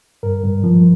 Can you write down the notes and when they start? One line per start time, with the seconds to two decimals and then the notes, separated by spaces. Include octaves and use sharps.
0.23 G2 A#4
0.43 G2
0.64 F3